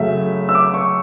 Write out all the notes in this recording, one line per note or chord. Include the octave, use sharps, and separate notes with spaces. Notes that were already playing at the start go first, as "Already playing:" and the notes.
Already playing: F#2 C#3 F#3 A3 E5
E6
D6
C#6